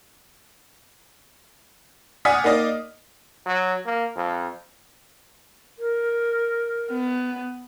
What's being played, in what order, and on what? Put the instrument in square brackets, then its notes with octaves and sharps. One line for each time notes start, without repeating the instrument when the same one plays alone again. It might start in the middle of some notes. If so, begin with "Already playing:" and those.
[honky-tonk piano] D5 F#5 G#5 D#6 F6 B6
A#3 D#4 D5 D#5
[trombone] F#3
A#3
F2
[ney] A#4
[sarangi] B3